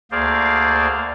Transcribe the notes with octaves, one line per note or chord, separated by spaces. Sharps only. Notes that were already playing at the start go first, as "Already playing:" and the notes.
D2 A#3 G#4 C5 D5 F5